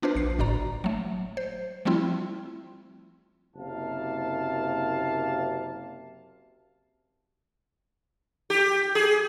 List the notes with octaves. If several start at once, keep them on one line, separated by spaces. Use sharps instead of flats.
B3 D4 F4 B4 C5
A#1 C7
G1 A2 F#4 D5 A#5
F#3 A3
C5
F3 G3 A3 C4 E4 F4
F#1 C3 A#3 F5 A5
G4
G#4